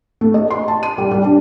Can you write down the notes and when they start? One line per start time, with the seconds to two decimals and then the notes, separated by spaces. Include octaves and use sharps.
0.21 A3
0.34 D#5
0.50 C6
0.68 A5
0.83 D#7
0.98 G3
1.11 G3
1.24 D4